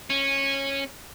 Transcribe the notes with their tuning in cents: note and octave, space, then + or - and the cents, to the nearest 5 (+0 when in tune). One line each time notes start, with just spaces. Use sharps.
C#4 -15